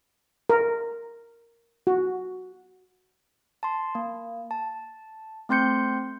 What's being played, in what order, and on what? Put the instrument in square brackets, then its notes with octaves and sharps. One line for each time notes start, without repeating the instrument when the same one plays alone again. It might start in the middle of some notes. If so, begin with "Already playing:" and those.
[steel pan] A#4
F#4
[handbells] A5 C6
A#3
A5
A3 C4 C6 G6 C#7